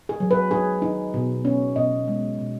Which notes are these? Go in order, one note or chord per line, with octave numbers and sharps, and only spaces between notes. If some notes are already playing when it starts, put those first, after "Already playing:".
G#4
F#3
B4
D#4 G#4
D#4
B2
C#4
B2 D#5
G#3
B2